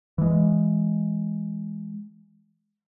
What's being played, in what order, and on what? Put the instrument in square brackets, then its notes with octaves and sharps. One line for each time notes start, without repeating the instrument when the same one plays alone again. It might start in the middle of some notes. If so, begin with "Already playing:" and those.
[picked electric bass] E3 G#3